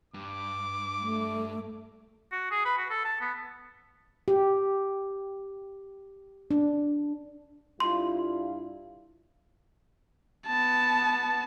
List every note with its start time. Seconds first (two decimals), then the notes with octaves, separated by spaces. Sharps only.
0.14 G2 D6
1.01 A3
2.32 F#4
2.51 G#4
2.65 B4
2.78 F#4
2.90 A4
3.05 A5
3.21 B3
4.28 G4
6.51 D4
7.80 G2 E4 F4 C6
10.47 B3 A5